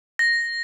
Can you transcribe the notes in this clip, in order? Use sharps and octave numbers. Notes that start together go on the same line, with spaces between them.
A#6